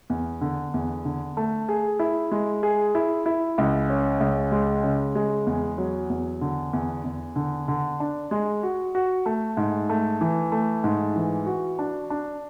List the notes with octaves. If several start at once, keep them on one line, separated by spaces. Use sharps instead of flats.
E2
D3
E2
D3
A3
G#4
E4
G#3
G#4
E4
E4
C#2
C#4
C#2
G#3
C#3
G#3
E2
F#3
E2
D3
E2
E2
D3
D3
D4
G#3
F#4
F#4
A3
G#2
A3
E3
A3
G#2
E3
F#4
D4
D4